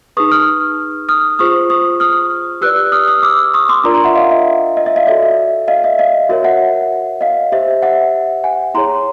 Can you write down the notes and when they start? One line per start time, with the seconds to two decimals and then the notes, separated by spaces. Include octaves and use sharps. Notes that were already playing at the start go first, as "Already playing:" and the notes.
0.17 D#4 G#4 B4 C#6 D#6
0.32 D#6 F6
1.09 D#6 F6
1.39 F4 G#4 C5 C#6 D#6
1.70 C#6 D#6
2.00 D#6 F6
2.61 G4 B4 D5 E6 F#6
2.92 D#6 F6
3.07 D#6 F6
3.23 D6 E6
3.54 C#6 D#6
3.69 C6 D6
3.84 D4 F4 A#4 D5 A#5 C6
3.94 A#5 C6
4.04 E5 F#5
4.15 D#5 F5
4.31 E5
4.77 D#5
4.86 E5
4.96 D#5 F5
5.07 F#4 A4 D5 E5
5.23 E5
5.68 D#5 F5
5.84 E5
5.99 D#5 F5
6.29 F#4 A#4 C#5 E5
6.44 E5 F#5
7.21 D#5 F5
7.52 G4 C5 E5
7.82 E5 F#5
8.44 F#5 G#5
8.74 E4 G#4 C#5 A#5 C6